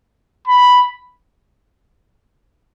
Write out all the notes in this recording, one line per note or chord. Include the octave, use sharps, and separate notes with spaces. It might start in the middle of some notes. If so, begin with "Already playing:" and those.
B5